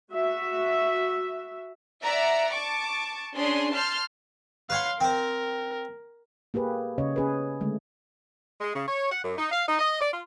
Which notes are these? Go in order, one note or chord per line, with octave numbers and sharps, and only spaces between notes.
F#4 E5
D5 E5 F#5 A#5
A5 C#6 D6
C#4 D4 G#4 C6
A5 C6 F6 G6
B4 C#5 F5 F#5 C6
C4 A#4 C5
A#3 G4 G#4 B4
C#3 C#4 C#5 D#5
C#4 G#4 B4
D3 G#3 A3
G#3
C#3
C#5
F#5
F#2
D#4
F5
D#4
D#5
D5
F4